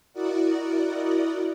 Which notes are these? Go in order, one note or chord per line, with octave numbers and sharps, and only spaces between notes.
E4 F#4 A#4 D5 D#5 F#5